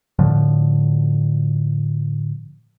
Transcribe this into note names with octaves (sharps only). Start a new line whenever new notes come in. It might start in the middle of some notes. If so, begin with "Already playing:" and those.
A2 D3 F3